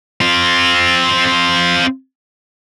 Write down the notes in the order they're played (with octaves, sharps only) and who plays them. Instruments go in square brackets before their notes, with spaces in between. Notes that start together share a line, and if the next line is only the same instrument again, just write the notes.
[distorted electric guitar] C4 F4